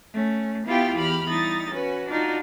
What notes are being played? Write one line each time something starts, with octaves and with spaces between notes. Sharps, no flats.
A3 C#4
B3 E4 F4 G4 F5 G5
E2 G4 B5 F6
G3 D#4 E4 A6
C#4 F#4 B4
D4 D#4 F4 F#4